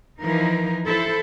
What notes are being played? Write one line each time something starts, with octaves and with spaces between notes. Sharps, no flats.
E3 F3 D#4 A#4
E4 A4 C5